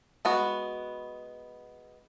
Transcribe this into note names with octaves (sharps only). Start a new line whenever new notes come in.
G#3 B3 F#4